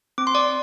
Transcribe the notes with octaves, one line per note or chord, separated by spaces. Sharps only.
C4 D6
C6
D5 D6